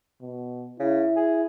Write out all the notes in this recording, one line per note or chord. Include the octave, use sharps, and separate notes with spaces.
B2
C#3 E4
G#4